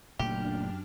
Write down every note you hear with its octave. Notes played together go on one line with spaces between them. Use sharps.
F#1 F#2 A#2 A3 D4 G4 F6